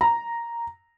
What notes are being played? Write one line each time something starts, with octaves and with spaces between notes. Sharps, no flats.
A#5